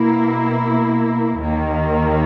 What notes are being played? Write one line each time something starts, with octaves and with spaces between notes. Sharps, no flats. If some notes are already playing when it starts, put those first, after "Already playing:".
Already playing: B2 A#3 E4
D#2 D#3 A#3